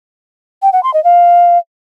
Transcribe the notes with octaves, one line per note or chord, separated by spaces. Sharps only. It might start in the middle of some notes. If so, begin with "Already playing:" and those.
G5
F#5
C6
D#5
F5